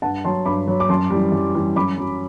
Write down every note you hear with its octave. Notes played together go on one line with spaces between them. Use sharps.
G2 F#5 A5
F#3 A5 C6
G2 B5 D6
F#3
D6
F#2 A5 C6
E3 G3
F#2
E3 G3
F#2 B5 D6
F#3